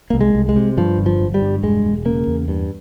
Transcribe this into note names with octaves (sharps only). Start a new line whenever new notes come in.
C2 A#3
G#3
C2
G#3
C3
G2 F3
G1
F3
G1
G3
G2
E1 G#3
E1
C#3 A#3
E2
G2